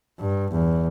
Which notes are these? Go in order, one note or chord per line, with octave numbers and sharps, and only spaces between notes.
G2
E2